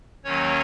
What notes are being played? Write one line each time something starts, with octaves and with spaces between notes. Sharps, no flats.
D#2 D#3 F#3 A#3 C#4 C#5